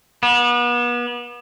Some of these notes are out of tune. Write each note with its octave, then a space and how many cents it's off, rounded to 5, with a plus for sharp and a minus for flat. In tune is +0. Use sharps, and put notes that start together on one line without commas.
B3 -35